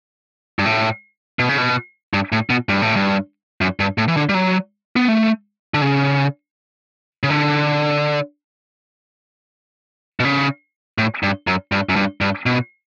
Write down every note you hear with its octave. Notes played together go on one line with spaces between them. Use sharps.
G2
A2
B2
C#3
B2
G2
A2
B2
G2
A2
G2
F#2
G2
A2
E3
D3
G3
F#3
B3
A3
D3
C#3
C#3
D3
B2
C#3
A2
G2
F#2
G2
F#2
G2
G2
B2